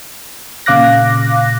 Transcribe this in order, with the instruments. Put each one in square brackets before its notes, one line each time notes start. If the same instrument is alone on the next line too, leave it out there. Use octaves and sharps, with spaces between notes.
[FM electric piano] A#2 C#3 F5 D6 F#6 A#6